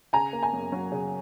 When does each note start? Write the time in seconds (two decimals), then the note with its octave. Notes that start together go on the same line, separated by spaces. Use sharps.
0.13 C#3 G#5 A#5
0.33 A#3
0.43 G#5 A#5
0.53 F#2
0.72 F#3
0.92 C#3